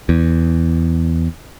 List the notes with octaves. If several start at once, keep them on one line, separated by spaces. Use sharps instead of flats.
E2